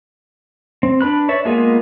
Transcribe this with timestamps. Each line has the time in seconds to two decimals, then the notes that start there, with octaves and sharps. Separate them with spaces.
0.83 C4
1.01 D4 B4 B5 F#6
1.29 C#5 D5 E5
1.45 G#3 A#3 B3 F4 G#4